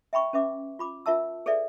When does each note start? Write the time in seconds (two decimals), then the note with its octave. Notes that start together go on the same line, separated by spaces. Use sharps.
0.13 E5 G5 B5 C#6
0.33 C#4 B4 E5 D6
0.79 F4 B5 D6
1.06 F4 A#4 E5 A5 E6
1.46 G#4 A4 B4 D5 E5